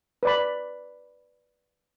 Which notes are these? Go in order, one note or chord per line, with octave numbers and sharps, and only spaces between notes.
B4 D5 B5